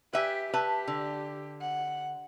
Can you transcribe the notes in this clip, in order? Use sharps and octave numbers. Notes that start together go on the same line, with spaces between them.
G4 B4 E5 G#5
G4 B4 E5 A5
D3
F#5